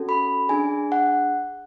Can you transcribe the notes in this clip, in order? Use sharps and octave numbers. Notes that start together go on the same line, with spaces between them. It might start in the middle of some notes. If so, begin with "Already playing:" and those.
Already playing: C#4 F#4 A4
B5
D4 G#4 G#5
F#5